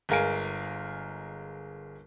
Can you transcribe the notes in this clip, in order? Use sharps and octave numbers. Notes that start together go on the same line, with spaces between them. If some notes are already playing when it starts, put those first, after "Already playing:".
G1 G#3 A#4 F5 G#5 D7